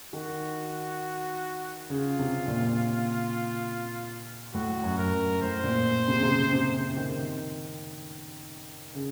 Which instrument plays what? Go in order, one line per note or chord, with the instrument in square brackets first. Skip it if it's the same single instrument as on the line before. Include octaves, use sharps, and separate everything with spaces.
[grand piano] D#3 [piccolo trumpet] F#4
[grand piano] C#3 [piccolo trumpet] F4
[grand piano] C3
A#2
[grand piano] A2 [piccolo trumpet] F#4
[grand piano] F#2
[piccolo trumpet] A#4
[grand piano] F#2
[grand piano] A2 [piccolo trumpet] C5
[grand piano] A#2
C3
C#3
C3
C#3
C3
C#3
D#3
C#3